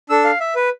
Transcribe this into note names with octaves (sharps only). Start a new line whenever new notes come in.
D4 A4 E6
F5
E5
B4